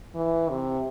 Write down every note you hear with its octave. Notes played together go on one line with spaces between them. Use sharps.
E3
C3